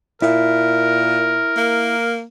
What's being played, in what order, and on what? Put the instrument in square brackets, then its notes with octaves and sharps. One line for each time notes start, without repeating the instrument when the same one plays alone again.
[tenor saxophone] A#2 [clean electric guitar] E4 [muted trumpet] A#4
[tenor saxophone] A#3